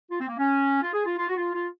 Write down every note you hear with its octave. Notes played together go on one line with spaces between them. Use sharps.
F4
C4
A#3
C#4
F4
G#4
F4
F4
F#4
F4
F4